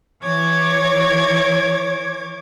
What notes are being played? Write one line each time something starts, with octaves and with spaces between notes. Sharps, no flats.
E3 C#5 D6 G#6